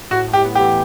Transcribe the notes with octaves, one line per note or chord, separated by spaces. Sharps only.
A2 F#4
A2
G4
B3
E3 G4